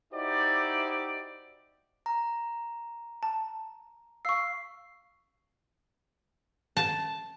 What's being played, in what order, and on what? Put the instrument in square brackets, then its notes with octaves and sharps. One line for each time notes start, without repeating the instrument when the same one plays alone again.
[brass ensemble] D#4 E4 F#4 G4 C5 D5
[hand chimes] A#5
[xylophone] A5
[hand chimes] F5 C7 [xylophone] C#6 E6
[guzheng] A5